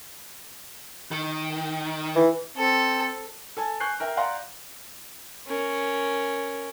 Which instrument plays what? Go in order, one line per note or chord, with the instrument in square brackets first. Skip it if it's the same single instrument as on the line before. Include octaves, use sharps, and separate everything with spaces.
[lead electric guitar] D#3
[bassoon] E3
[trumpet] C4 [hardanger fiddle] A4
[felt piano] A4 G#5 A5
G#5 C#6 F#6 G6 C7
A#4 E5 G5 A#5
D5 F5 F#5 A#5 C6
[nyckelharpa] C#4 A#4